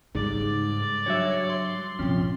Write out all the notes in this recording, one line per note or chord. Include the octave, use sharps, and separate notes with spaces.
G#2 C#3 G3 D5
G2 F#3 C#5 E5
C6
A#1 G2 C3 F3 C#4